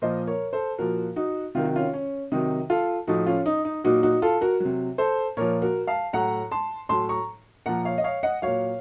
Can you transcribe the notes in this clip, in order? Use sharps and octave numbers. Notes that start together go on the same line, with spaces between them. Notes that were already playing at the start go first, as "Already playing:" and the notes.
A#2 F3 C5 D#5
A#4 C#5
A4 C5
A#2 F3 F#4 A#4
D#4 F#4
C3 D#3 F#3 F4
F#4
C#4 F4
C#4
C3 D#3 F#3 D#4
F4 A4
A2 F3 D#4 F#4
C#4 F4
D#4
D#4
A#2 F#3 D#4 F#4
D#4 F#4
F4 A4
F#4 A#4
C3 F#3
A4 C5
A#2 F3 A#4 C#5
F#4 A#4
F5 A5
A2 F#3 F#5 A#5
A5 C6
A2 F#3 A5 C6
A#5 C#6
A#2 F3 F#5 A#5
C#5 F5
D#5
C#5 F5
D#5 F#5
A#2 F#3 C#5 F5